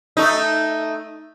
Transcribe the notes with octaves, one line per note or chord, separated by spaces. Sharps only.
A3 D#4